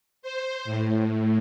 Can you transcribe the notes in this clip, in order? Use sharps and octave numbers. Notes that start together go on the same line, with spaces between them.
C5
A2